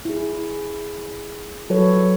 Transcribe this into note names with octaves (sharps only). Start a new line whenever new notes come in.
E4 G#4
F#3 A4 B4 C#5